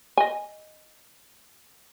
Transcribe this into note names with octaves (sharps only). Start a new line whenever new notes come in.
D#5 G#5